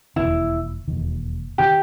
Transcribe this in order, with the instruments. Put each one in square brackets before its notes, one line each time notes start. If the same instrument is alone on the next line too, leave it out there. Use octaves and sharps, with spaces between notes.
[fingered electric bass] E1 D#2 D#3 [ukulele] E4
[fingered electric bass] E1 D#2 D#3
[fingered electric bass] D#3 [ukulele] G4